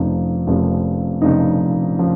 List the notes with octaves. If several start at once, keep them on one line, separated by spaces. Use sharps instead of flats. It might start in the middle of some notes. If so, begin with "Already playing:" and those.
Already playing: F1 F2 C#3 F3 D#4
F1 F2 C#3 F3
F1 F2 C#3 F3 D#4
C#3 F3